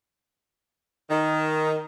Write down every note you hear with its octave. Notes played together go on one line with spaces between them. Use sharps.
D#3